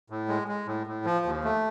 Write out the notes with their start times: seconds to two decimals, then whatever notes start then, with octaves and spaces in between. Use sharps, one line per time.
0.10 A2
0.29 G#3
0.48 G#3
0.67 A2
0.87 A2
1.05 F3
1.25 D#2
1.44 A3